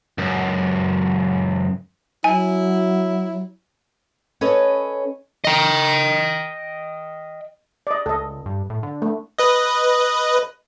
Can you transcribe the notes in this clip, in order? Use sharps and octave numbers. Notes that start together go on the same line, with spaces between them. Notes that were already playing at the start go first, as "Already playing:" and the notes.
C#2 F#2
F#3 E4 G#5
C#4 A4 B4 C#5 D#5
D#5 G5
D5 D#5
C#2 A4 D#5
G2
A2
D3
A3
B4 D#5